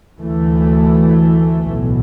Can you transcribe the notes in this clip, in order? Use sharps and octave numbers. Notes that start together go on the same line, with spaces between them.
D2 E3 A3
B1 A2